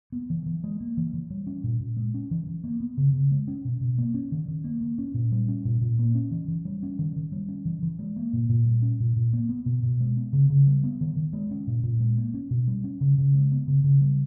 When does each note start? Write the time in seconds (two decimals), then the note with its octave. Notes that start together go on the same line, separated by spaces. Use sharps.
0.12 B3
0.30 E3
0.46 E3
0.64 G#3
0.80 A#3
0.97 E3
1.14 E3
1.30 G3
1.47 C#4
1.64 A#2
1.80 A#2
1.97 G#3
2.14 C#4
2.31 E3
2.47 E3
2.64 A#3
2.80 B3
2.97 C#3
3.13 C#3
3.31 G#3
3.48 C#4
3.65 B2
3.81 B2
3.98 A#3
4.14 C#4
4.32 D#3
4.48 D#3
4.64 A#3
4.81 A#3
4.98 C#4
5.14 A#2
5.32 G3
5.48 C#4
5.65 A#2
5.81 A#2
5.99 A#3
6.15 C#4
6.31 E3
6.48 E3
6.65 G3
6.83 C#4
6.99 D#3
7.16 D#3
7.32 G3
7.48 C#4
7.65 E3
7.83 E3
7.99 G#3
8.16 A#3
8.33 A#2
8.49 A#2
8.65 G3
8.82 C#4
9.00 A#2
9.16 A#2
9.33 A#3
9.49 B3
9.66 B2
9.83 B2
10.00 G#3
10.17 B3
10.33 C#3
10.50 C#3
10.67 G3
10.84 B3
11.01 D#3
11.16 D#3
11.33 G#3
11.51 C#4
11.67 A#2
11.83 A#2
12.00 G#3
12.17 A#3
12.34 C#4
12.51 B2
12.68 G3
12.84 C#4
13.01 C#3
13.18 C#3
13.34 G#3
13.52 B3
13.67 C#3
13.84 C#3
14.01 G3